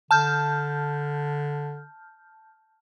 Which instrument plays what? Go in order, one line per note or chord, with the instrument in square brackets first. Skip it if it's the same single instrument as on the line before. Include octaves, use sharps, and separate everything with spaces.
[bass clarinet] D3 [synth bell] A5 F6 G6